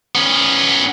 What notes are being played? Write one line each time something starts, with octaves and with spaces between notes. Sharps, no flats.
B3 C#4